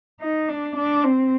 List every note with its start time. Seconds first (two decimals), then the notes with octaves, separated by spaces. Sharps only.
0.21 D#4
0.49 D4
0.76 D4
1.04 C4